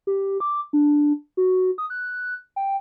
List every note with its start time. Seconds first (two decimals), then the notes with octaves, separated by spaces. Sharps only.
0.07 G4
0.40 D6
0.73 D4
1.37 F#4
1.78 D#6
1.90 F#6
2.56 G5